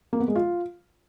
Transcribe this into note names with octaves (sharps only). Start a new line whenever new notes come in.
A#3
B3
G#3
F4